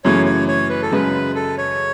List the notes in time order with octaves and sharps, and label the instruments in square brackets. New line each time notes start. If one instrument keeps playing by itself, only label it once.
[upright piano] F#2 C#3 E3 A3 [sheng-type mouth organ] C#5
[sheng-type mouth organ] C#5
C#5
B4
A4
[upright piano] F#2 C#3 G#3 [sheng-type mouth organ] B4
[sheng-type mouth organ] A4
C#5